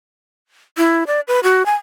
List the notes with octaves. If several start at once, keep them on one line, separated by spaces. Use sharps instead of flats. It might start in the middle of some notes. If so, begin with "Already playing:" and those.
E4
D5
B4
F#4
G#5